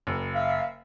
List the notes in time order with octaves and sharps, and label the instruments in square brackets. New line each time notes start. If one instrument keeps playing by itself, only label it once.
[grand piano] F#1
[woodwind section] E5 F5